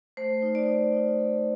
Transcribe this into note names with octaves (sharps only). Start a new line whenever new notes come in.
A3 C5
D#4
D5
D#4
D#4
A3